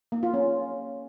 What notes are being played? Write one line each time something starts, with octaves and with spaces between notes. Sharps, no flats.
A#3
F4
C#4